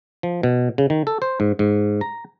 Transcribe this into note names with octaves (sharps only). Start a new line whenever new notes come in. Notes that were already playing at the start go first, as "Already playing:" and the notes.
F3
B2
C#3
D#3
A4
C5
G#2
G#2
A#5